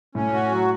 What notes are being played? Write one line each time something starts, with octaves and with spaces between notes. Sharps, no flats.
A2 C#4
F#4
F#3